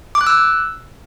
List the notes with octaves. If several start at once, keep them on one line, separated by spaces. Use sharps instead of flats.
D6
F#6
E6